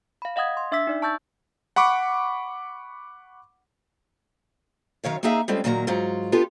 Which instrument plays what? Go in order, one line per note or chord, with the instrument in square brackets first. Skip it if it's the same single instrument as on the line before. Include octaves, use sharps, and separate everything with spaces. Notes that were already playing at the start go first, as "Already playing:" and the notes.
[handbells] F5 B5
D#5 F5 F#5 D#6 G#6
C6
D4 E5 D6 E6 B6
D#4 D5 E5
A5 C#6 E6 G6 A6
[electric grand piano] F#5 B5 C#6 D6
[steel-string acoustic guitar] F#2 D#3 C#5 F5
A#3 C4 D#4 G#4 E5 F5
G3 G#3 C4 C#4 F4 A4
A#2 D#3 F#3 A#3 A4 A#5
G#2 F#3 F4
B3 D4 F4 G4 A4